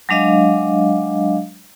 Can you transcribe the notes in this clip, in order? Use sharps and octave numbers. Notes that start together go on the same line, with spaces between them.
F#3 G#3 D4 D#5 F5